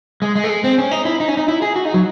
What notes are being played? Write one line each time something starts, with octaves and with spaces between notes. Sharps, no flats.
G#3
G#3
A3
G#3
C4
C#4
D#4
E4
D#4
C#4
D#4
E4
G#4
F#4
D#4
F#3